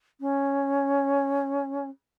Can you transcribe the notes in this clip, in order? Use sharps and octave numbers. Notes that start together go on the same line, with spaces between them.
C#4